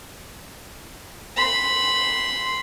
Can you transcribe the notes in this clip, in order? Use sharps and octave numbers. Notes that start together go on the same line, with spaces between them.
B5 C6